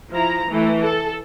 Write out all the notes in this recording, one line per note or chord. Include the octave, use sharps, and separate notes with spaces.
F3 E4 A#5
E3 A3
A4